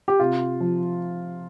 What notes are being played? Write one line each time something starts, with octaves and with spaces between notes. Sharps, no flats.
G4
C3 F4
F3